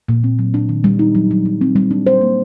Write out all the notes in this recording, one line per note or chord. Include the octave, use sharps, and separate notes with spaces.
A#2
C4
F#3
D4
D#3
G3
D#4
F#3
F#3
F#3
C4
G3
D4
C5
A#3